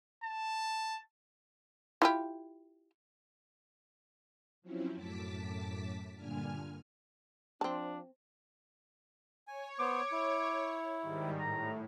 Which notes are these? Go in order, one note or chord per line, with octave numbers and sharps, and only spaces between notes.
A5
E4 F4 G4
F3 F#3 C4 C#4 E4
F#2 A2 A5 D6 B6
G2 A#2 D3 G#5 F6
F3 C4 D4 A5
C#5 G#5
B3 C5 D6
E4
G#2 D#3 G3
A2 A#5